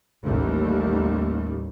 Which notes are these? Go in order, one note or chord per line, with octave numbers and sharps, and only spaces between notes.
A1 D#2 G3